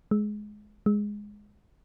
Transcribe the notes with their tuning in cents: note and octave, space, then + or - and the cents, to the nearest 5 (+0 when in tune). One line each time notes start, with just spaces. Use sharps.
G#3 +15
G#3 -5